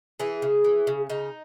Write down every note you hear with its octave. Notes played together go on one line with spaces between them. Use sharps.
E3 G#4
C#3
E3
C#3
C#3 D#4